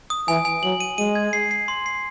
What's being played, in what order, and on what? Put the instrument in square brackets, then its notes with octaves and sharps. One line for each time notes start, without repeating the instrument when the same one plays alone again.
[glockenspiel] D#6
[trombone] E3 [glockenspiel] G#5
[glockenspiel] G#5
[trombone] F#3 [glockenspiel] F#7
[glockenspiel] D#7
[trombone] G#3 [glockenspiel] D#7
[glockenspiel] G#6
C7
C7
C6
C7